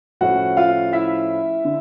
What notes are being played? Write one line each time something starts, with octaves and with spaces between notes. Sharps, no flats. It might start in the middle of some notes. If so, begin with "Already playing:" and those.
A2 F3 A3 C#4 F#4 F#5
F4 F5
E4 E5
D3